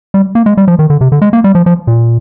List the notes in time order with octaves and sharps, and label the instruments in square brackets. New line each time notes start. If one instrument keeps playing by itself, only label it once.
[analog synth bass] G3
A#3
G#3
G3
F3
D#3
D3
C3
D3
G#3
A#3
G3
F3
F3
A#2